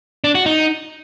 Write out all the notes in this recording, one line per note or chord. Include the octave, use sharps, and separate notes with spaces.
D4
F#4
D#4